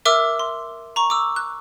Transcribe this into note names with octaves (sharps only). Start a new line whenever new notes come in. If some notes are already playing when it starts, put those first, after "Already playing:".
A#4 E5 D6 E6 F6
C6
A#5 C#6
D6 E6
F#6